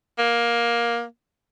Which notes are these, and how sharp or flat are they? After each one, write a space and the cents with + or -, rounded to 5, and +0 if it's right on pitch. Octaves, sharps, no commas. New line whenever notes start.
A#3 +15